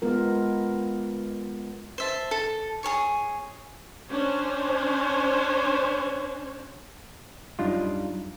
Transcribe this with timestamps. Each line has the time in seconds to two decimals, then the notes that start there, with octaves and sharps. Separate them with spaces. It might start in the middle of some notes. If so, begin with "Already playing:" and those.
0.02 G#3 B3 F4 A#4
1.98 C5 E5 A5
2.31 A4
2.83 G#4 A4 C#5 C#6
4.09 C#4 D4 C5 C#5
7.59 F#2 G3 D4 D#4 F4